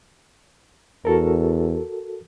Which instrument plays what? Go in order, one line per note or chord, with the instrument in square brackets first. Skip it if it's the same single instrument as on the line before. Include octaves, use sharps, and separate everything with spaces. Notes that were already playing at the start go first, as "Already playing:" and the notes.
[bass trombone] E2 [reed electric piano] F#4 A4 A#4